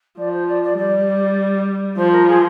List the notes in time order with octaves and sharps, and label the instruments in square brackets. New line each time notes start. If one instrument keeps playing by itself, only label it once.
[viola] F3 [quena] D5
[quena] C5
D5
D5
[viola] G3 [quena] D5
[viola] F3 [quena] C5
[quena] A#4
G#4